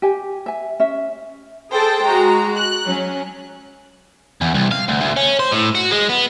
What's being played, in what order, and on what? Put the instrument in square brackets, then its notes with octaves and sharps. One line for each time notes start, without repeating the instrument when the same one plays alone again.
[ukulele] G4 G#5
E5 G#5
C#4 E5
[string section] G#4 A4 C5 G5 A5
G#3 F#4 A#5
F#6
F#3 C#4
[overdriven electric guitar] E2
C2
F5
D2
D2
C#4
C5
A2
F#4
G#3
B3